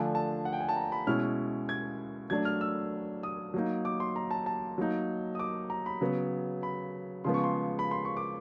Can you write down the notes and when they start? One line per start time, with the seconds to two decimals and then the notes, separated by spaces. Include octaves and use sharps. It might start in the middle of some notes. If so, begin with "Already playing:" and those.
Already playing: D3 F3 A3 D4 G#5
0.15 A5
0.45 F#5
0.53 G5
0.60 G#5
0.69 A5
0.76 A#5
0.92 B5
1.07 B2 G#3 C#4 E4 F6
1.69 G#6
2.30 F#3 A3 D4 G#6
2.45 F6
2.61 E6
3.23 D#6
3.54 F#3 A#3 D#4
3.85 D6
4.00 C6
4.16 A#5
4.31 A5
4.46 A5
4.78 F#3 A#3 D#4
5.35 D#6
5.39 D6
5.70 A#5
5.86 B5
6.01 C#3 F#3 B3
6.63 B5
7.24 C#3 F3 G#3 B3 C6
7.34 C#6
7.44 C6
7.79 B5
7.91 C6
8.05 C#6
8.17 D6